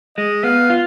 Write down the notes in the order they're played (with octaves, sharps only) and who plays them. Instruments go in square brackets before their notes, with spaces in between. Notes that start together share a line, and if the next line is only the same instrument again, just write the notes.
[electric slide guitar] G#3 [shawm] D#5
[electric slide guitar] B3 [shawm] F5
[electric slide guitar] F4